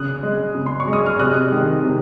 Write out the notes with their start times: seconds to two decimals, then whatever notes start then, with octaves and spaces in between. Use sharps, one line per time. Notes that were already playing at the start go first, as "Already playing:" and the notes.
Already playing: C#3 D#6 F#6
0.23 G#3
0.55 C#3
0.66 C6
0.80 C#6
0.87 G#3
0.93 D#6
1.06 F6
1.19 C3 D#6 F#6
1.52 D#3 G#3
1.84 C3